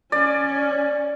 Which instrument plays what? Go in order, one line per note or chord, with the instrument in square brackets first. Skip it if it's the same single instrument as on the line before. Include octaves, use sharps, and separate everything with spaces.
[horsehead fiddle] C#4 [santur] D5